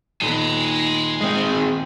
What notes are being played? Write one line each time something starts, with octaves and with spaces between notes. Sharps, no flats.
D#1 B3 G#5 C6
G#3 C4